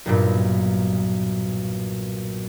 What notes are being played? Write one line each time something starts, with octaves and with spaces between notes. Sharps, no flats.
B1 G2 A#2